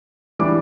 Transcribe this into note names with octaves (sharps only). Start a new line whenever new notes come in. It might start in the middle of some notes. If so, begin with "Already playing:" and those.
E3 G3 D4 D6